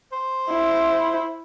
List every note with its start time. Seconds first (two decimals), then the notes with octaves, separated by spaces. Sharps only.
0.12 C5
0.50 E4